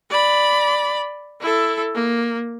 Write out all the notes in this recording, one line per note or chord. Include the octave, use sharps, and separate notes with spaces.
D5 B5
E4 A4
A#3